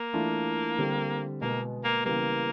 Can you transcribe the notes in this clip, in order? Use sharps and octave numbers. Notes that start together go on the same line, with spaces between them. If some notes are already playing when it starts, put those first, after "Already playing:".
Already playing: A#3
E3 A3 D4 F4
D3 G3 C4
B2 G#3 A#3 B3
A#3
C#3 E3 G3 A#3 B3